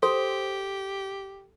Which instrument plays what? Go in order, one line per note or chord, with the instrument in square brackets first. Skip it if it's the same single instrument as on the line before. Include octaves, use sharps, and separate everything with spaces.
[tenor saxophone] G4 [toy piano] A4 [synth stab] C5